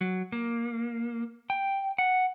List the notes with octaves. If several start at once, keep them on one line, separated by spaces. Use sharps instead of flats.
F#3
A#3
G5
F#5